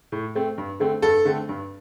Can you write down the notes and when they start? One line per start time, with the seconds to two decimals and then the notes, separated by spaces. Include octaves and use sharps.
0.12 A2
0.35 A3 C4
0.58 G2
0.80 D3 A3 C4
1.02 G2 A4
1.25 D3 A3 C4
1.49 G2